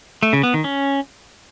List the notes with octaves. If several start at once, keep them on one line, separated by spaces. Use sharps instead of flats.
A3
C#3
B3
D#3
C#4